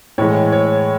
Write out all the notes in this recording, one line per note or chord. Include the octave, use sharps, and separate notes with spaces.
A2 E3 G#3 C#5
C#5